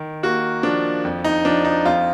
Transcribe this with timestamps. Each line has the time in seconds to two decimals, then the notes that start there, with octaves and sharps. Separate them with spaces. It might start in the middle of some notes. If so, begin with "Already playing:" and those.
Already playing: D#3
0.23 A#3 F#4
0.63 F3 D4
1.04 F2
1.24 D#4
1.45 F3 D4
1.65 D#4
1.85 F2 F4